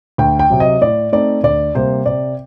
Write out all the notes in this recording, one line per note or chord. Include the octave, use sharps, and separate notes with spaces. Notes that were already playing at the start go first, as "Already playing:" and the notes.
D2 G5
G5
C3 F#3
D#5
A2 D5
A3 C4 D#4 D5
D2 D5
C3 G3 A#3 C5
C3 D5